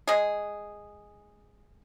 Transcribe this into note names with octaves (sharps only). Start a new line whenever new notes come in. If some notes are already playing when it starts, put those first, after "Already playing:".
G#3 G#4